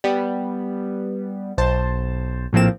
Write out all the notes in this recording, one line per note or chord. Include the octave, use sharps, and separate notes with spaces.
G3 B3
B1 C5 A5
A#1 A2 F3 A#3 C4 E7